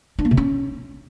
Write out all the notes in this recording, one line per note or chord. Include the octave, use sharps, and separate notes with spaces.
D4
A#3
C3
C#4